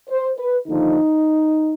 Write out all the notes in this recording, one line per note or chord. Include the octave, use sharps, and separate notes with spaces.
C5
B4
D#2 D3 F3 D#4